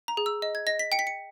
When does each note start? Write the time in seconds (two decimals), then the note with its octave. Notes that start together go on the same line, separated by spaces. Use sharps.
0.08 A#5
0.17 G#4
0.26 E6
0.42 D#5
0.55 G#6
0.67 D#5 A#6
0.79 B6
0.92 G5 C#7
0.99 B6
1.07 C#7